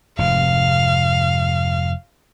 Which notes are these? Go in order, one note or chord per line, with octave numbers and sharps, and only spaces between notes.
F1 G#2 C3 F5